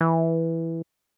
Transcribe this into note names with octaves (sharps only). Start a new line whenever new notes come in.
E3